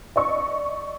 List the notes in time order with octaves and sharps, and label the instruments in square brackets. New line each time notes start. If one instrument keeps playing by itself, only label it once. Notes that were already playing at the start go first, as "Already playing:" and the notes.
[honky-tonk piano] D5 D#5 C#6